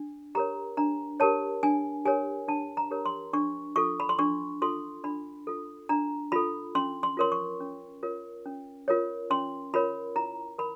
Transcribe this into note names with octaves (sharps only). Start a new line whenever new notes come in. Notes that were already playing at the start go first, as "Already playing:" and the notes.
Already playing: D4
G4 A#4 C#5 A#5
D4 A#5
G4 A#4 C#5 A5
D4 G#5
G4 A#4 C#5 G#5
D4 A5
A#5
G4 A#4 C#5
C6
D4 C#6
F4 A4 C#6
B5
C6
D4 C#6
F4 A4 C6
D4 B5
F4 A4
D4 A#5
F4 A4 B5
C#4 C6
C6
F4 A#4 C#5 C6
C#6
C#4
F4 A#4 C#5
C#4
F4 A#4 C#5
C#4 C6
F4 A#4 C#5 B5
E4 A#5
A#4 B5